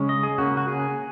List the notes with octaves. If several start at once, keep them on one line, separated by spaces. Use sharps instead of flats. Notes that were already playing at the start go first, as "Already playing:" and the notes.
Already playing: C#3 G#3 C#4
D#5
G#4
C#3 A#3 C#4 F#4
F#4
G#4